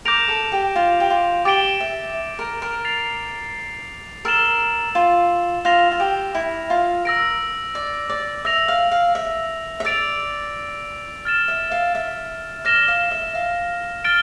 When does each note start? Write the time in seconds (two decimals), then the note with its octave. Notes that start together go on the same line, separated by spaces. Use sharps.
0.05 A#4 D6 G6 A#6 D7 F7
0.28 A4
0.52 G4
0.76 F4
1.00 G4
1.10 F4
1.45 G4 D6 A6 D7 G7
1.80 E5
2.39 A#4
2.62 A#4
2.85 A6 C7 F7
4.25 A#4 E6 A6 E7 G7
4.95 F4
5.65 F4 F6 A#6 F7
5.92 F4
6.00 G4
6.35 E4
6.70 F4
7.05 A#4 E6 A#6 D7
7.75 D5
8.10 D5
8.45 E5 E6 A#6 F7
8.68 F5
8.91 F5
9.15 E5
9.80 E5
9.85 D5 E6 A6 D7 F7
11.25 F6 A6 E7
11.48 E5
11.71 F5
11.95 E5
12.65 D5 F6 A#6 E7 G7
12.88 F5
13.11 E5
13.35 F5
14.04 F6 A6 D7 G7